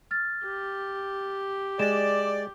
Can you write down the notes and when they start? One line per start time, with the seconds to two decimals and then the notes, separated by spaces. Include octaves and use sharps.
0.11 F6 A6
0.45 G4
1.79 G#3 D5 E7